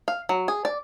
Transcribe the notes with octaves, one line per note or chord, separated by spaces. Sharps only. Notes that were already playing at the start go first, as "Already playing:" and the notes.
F5
F#3
G#4
D5